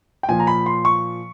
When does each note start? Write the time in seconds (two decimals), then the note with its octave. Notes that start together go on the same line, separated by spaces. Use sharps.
0.23 G5
0.29 A#2 F3 G#5
0.40 A#5
0.47 B5
0.66 C6
0.85 C#6